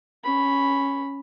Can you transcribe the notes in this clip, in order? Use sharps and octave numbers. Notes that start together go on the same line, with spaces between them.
C#4 B5